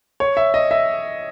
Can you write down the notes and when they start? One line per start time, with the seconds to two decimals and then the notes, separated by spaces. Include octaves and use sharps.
0.20 C#5
0.37 E5
0.54 D#5
0.71 E5